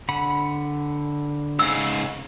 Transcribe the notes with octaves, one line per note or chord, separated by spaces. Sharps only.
D3 F#5 B5
G#2 C#3 E6